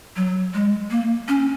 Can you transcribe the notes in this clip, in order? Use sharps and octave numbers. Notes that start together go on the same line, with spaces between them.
F#3
G#3
A#3
C#4